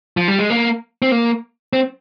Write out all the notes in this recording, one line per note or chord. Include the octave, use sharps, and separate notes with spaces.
F3
G3
G#3
A#3
C4
A#3
C4